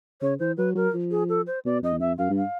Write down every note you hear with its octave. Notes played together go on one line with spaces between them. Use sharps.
C#3 C#5
E3 C5
F#3 B4
F#3 A#4
F3
G#4
A4
C5
B2 D5
F2 D#5
E2
F2 E5
F#2 F5
G2
F5